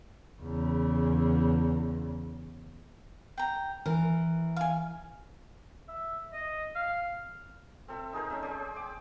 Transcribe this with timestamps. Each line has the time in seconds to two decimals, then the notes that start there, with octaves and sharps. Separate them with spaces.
0.41 E2 C#3
3.37 G5 A#5
3.86 E3 A#4
4.56 F5 G#5
5.88 E5
6.33 D#5
6.76 F5
7.88 C4 A4 E5
8.13 D#4 G#4 A#4 C5
8.30 A3 C#4 E5
8.42 G#4 C5 D5
8.76 G5 D6